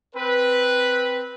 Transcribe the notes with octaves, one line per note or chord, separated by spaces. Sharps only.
C4 B4